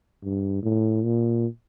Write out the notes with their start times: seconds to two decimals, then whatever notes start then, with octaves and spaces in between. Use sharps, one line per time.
0.23 G2
0.63 A2
1.04 A#2